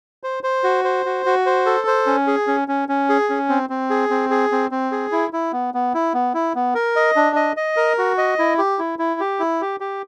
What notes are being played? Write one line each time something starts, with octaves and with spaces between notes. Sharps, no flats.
C5
C5
F#4
C5
F#4
F#4
C5
A4
C5
C#4
G#4
C#4
C#4
C#4
G#4
C#4
C4
C4
G#4
C4
G#4
C4
C4
G#4
E4
E4
B3
B3
E4
B3
E4
B3
A#4
D#5
D4
D#5
D#5
A#4
F#4
D#5
E4
G4
E4
E4
G4
E4
G4
G4